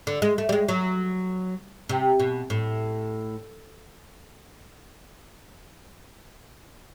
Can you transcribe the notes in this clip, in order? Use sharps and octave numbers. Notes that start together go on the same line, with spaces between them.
D3
G#3
A3
G3
G#3
F#3
C3
B2
A2